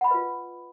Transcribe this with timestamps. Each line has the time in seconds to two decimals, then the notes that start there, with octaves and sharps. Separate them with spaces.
0.01 F#5
0.04 B5
0.08 D#5
0.11 B4
0.14 F4